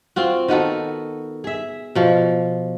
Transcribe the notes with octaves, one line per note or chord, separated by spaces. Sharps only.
C4 F4 F#4
D#3 B3 F#4 A4
G#4 E5
B2 F3